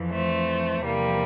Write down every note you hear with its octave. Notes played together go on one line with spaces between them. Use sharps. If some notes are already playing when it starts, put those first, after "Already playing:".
Already playing: F2 E3
A3 C4
E2 C3 F3 G3 A#3